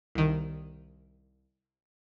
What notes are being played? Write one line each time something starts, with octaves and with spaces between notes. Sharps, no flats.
C2 D#3